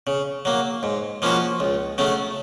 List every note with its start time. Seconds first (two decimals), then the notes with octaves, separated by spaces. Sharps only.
0.07 C#3
0.45 F#3 A#3
0.83 G#2
1.22 F3 A#3 C#4 F#4
1.60 C#2
1.98 C#3 F#3 A3 C#4